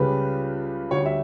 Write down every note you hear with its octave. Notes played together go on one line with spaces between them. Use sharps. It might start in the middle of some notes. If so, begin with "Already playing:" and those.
Already playing: C#2 C#3 G3 B4
D2 D3 G3 C#5
E5